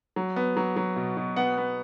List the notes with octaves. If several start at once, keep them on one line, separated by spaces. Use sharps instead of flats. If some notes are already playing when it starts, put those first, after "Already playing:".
F#3
B3
F#3
F#3
B2
B2
B3 F#5
B3